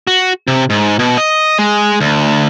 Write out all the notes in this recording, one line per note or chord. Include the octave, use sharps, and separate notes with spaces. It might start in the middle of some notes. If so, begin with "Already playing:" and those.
F#4
C3
G#2
B2
D#5
G#3
D2